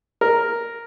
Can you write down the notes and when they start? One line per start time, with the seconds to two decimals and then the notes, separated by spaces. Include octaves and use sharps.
0.21 A#4